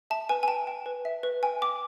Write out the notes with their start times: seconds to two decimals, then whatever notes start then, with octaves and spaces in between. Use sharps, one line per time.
0.10 E5 A5
0.29 B4 G#5
0.43 G#5
0.48 G5 A5
0.67 G5
0.86 B4
1.05 E5
1.23 B4
1.43 G5 G#5
1.62 G5 D6